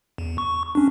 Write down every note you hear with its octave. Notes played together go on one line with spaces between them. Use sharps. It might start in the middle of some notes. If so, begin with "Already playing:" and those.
E2
C#6
C#4 D4